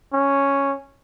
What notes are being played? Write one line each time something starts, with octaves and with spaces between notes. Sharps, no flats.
C#4